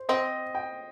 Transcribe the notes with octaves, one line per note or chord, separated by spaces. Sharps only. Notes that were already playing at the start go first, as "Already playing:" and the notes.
Already playing: C5
C4 D#5
G5